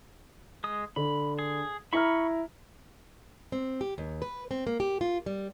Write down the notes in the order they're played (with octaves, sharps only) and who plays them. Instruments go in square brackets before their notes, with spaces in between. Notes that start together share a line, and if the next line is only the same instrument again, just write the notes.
[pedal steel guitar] G#3 D#6
[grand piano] D3 [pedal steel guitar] B5
[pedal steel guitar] G#4
[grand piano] E4 A#5 F6 [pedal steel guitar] B5 C#6
[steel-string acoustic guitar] C4
G4
D#2
B4
C4
A#3
G4
F4
G3